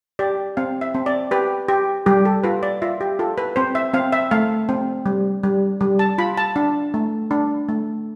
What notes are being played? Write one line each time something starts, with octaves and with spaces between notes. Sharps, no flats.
G4 D5
C4 F5
E5
C4
D5
G4 B4
G4
G3 G4
A4
F4 B4
D5
F4 E5
G4
F4 A4
B4
C4 C5
E5
C4 F5
E5
A3 F5
C4
G3
G3
G3
A5
F4 B5
A5
D4
A3
D4
A3